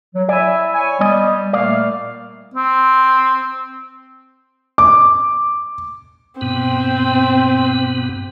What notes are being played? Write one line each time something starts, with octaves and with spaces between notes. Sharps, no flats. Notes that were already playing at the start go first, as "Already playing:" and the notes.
F#3
E4 D5 E5 G#5
C#5 G#5
G3 B3 D5 D#5
A#2 A3 A#3 D5 F5
C4
D6
G2 B2 B3 C4